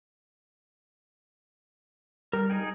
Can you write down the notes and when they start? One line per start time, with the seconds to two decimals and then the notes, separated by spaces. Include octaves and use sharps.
2.33 G3 A#4
2.50 D#4 G#4 G5